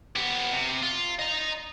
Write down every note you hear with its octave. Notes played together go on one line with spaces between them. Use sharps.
B3 G4
C3
F4
D#5 A#5